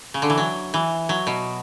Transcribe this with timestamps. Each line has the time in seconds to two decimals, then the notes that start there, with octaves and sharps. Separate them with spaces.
0.14 C#3
0.22 D3
0.30 E3
0.38 F#3
0.74 E3
1.09 F#3
1.27 B2